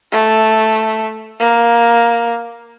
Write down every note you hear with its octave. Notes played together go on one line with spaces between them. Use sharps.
A3
A#3